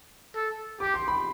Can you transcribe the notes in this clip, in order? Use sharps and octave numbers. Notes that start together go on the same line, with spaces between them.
A4
G4 D6
C6
B5